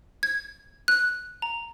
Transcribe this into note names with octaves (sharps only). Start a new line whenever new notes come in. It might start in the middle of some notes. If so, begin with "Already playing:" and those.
G#6
F#6
A#5